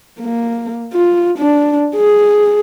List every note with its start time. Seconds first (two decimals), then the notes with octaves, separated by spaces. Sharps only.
0.21 A#3
0.93 F4
1.38 D4
1.96 G#4